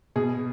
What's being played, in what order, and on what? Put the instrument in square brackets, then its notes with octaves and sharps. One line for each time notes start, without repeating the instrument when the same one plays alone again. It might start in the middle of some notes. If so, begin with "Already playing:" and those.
[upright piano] B2 G#4